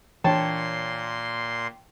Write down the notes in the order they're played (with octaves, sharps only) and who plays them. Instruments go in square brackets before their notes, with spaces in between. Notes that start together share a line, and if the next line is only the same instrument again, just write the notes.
[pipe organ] A#2 C6 [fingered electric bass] E3 D4 [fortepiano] C#5 A5 [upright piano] G5